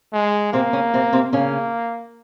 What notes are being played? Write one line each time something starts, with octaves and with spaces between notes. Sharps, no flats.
G#3
C3 A#3 C4
C#3 C#4
C3 C4
C3 C4
C#3 A#3 C#4